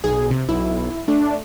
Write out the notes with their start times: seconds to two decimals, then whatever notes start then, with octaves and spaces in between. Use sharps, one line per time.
0.04 B1 G#4
0.31 C3
0.49 B1 E4
1.08 A3 D4